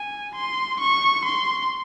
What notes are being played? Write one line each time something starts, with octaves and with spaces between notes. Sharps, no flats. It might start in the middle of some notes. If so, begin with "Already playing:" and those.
Already playing: G#5
C6
C#6
C6